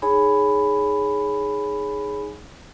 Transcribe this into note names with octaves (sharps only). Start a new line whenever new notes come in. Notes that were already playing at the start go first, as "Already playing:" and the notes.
D#4 G#4 C#5 G#5 B5